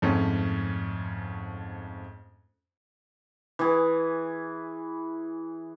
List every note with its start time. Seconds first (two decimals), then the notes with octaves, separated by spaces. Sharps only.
0.02 F2 G#2 A3 C#4
3.59 E3 G#4